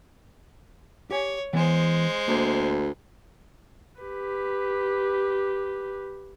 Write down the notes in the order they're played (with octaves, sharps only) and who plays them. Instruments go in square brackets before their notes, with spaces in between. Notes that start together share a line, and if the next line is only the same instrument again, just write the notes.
[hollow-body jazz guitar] G4 G#5 [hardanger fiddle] C#5
[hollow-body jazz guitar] E3 B3 G#5 [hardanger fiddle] G#3 C5
[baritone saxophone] D2 [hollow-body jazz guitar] A#3
[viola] G4 B4